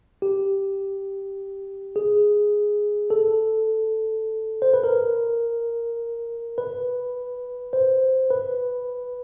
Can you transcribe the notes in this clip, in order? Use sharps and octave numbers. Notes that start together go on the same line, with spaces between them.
G4
G#4
A4
C5
B4
A#4
B4
C5
B4